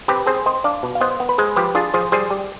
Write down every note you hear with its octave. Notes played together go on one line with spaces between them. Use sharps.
C4 G4 B4
C4 G#4 C5
C4 C5 D#5
D4 D5 F5
B2
F5
B3 C5 D#5
B3
B4
G#3 G#4 C5
F3 G4 B4
D4 F4 G#4
F3 G#4 C5
G3 G#4 C5
G3